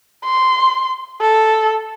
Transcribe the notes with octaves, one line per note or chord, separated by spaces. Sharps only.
C6
A4